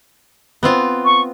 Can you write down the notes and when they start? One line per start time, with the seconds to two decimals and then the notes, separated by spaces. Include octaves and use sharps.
0.63 B3 C4 F4
1.05 C#6